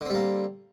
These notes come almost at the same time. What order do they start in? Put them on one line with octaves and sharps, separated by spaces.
D3 C4 G3 A#3